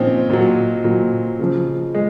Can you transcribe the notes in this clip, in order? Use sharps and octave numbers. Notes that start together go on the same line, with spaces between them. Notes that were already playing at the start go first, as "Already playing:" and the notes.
Already playing: A#2 F3 C4 C#4 D#4
A#2 F#3
A#2 F#3
C#3 F3
G#3